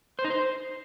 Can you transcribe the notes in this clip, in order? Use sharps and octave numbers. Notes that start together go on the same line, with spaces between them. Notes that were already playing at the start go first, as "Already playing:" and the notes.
C5
D#4
C5